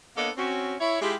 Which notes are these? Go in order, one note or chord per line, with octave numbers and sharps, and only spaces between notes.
A#3 B3 D4 A4 C#5 D#5
C4 C#4 F#4
E4 C#5
G#3 E4 F4 G4